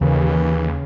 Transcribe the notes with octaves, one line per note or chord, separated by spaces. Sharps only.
D#2 C#3 E3